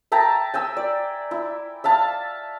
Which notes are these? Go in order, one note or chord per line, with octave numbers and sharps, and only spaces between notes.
E5 G5 A5 A#5
G5 G#5 E6
D5
E4
E5 F5 A5